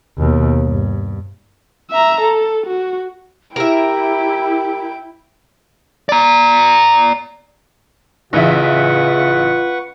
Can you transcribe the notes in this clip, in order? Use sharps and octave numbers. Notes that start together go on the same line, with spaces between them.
D#2 B2
G2
E5 A#5
A4
F#4
E4 G4 A#4 E5 G5
D5 A#5
A1 C#3 E3 F4 B4 E5 F#5 C#6